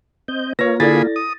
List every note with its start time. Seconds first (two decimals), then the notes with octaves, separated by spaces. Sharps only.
0.28 C4 D#5 G6
0.59 A#3 F4 B4 C#5 A#6
0.80 D3 E4 G#4 A4 D5 B5 A6
1.16 D#6